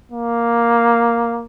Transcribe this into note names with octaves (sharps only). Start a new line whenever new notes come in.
A#3